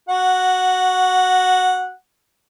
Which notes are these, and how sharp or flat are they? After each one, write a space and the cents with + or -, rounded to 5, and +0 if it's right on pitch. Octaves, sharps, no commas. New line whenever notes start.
F#4 +0 F#5 -10